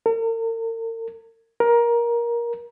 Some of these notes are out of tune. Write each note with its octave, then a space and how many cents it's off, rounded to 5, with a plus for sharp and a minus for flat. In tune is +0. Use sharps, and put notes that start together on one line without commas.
A#4 -45
A#4 +15